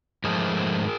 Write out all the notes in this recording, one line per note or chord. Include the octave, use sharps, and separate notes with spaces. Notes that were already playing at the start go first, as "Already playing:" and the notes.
G#2 F3 A3 G#4 A#4